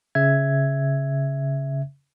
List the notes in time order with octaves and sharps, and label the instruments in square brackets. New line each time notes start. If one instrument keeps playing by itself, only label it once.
[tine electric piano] C#3 E5 G#6